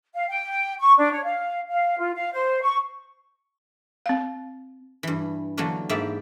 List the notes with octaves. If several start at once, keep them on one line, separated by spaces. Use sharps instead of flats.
F5
G5
C#6
D4
C#5
F5
F5
F4
F5
C5
C#6
C4 F5
G2 E3
D3 E3 F#3 A3 A#3
G#2 A#3 E4 G4 D5 E5